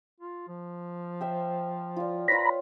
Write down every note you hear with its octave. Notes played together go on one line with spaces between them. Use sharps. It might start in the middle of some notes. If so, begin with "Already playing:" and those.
F4
F3
C5 E5 G5
F4 D5
F4 B4 C#5 A#5 B5